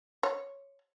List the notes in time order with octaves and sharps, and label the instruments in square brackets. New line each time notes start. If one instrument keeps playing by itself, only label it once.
[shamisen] C#5